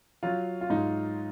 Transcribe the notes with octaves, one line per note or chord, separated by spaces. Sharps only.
F#3 F4
F4
G#2 D#4